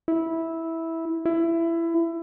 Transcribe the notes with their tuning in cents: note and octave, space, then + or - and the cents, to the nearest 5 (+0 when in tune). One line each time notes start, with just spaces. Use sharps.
E4 -10
E4 +20